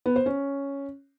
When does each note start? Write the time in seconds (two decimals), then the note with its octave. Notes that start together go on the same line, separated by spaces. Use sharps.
0.06 B3
0.16 C5
0.26 C#4